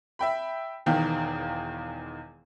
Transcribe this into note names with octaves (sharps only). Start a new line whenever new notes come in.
E5 G5 B5
E1 E2 D#3 F5 G5